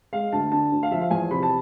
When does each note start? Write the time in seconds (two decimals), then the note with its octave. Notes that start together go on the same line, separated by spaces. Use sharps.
0.13 G#3 F5
0.32 D2 A5
0.52 D3 A5
0.72 D2
0.83 F5
0.91 F3 E5
1.01 F5
1.11 E2 G#5
1.31 C3 B5
1.43 A5